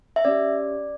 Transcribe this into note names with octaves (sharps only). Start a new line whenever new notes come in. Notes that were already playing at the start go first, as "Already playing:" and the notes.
E5
C#4 G4 D5